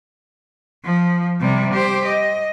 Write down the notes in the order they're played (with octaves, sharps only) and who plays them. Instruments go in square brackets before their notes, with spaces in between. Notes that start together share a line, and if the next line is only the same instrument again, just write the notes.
[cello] F3
C3 G3
G4 C5
D#5